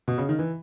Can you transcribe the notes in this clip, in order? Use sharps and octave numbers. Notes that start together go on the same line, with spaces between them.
B2
C#3
D#3
E3